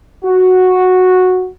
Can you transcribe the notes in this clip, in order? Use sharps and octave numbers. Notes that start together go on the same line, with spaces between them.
F#4